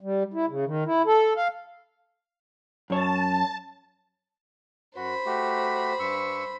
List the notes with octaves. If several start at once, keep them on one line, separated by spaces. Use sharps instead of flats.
G3
E4
C#3
D#3
E4
A4
F5
F#2 C#5 A5
F#2 F#4 C5 B5
A3 F#4 G4
G2 C#6 E6